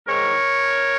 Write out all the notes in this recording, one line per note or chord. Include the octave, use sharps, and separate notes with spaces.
G#2 D#3 A#4 C#5